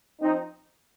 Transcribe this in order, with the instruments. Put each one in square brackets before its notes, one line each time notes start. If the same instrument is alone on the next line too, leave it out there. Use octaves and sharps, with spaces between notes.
[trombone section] F3 C4 D#4